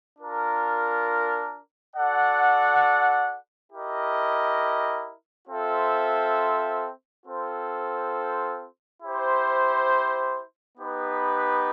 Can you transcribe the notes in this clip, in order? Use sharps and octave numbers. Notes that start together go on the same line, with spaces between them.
D4 F4 A#4
F#4 A4 D5 F#5
E4 G4 A#4 D#5
C4 F4 A4 C5 E5
C4 F4 A4 C5
E4 G4 C5
B3 D#4 G4 B4